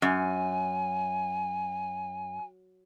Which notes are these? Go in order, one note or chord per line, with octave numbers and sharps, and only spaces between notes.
F#2 G#5